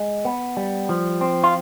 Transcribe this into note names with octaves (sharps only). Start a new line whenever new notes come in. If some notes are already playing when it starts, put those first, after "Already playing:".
Already playing: G#3
B3
G3
F3
C4
F4